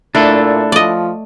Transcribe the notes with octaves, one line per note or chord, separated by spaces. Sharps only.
A#2 A3 D4 E4 A4
F3 D5 D#5